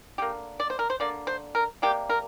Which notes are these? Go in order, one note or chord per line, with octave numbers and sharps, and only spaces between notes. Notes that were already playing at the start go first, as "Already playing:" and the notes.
D3 A#3 G4
D5
C5
A#4
C5
D3 A#3 D5
C5
A#4
C3 G3 A#3 G4
A#4